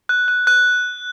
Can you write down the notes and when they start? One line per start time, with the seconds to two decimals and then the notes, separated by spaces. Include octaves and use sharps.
0.09 F#6
0.28 F#6
0.47 F#6